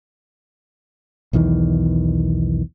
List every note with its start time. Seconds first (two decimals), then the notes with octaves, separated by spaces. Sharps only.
1.33 B1 E2 D#3 E3